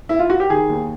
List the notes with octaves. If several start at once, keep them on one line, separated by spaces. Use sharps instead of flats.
E4
F4
F#4
G4
D#3 G#4
D#2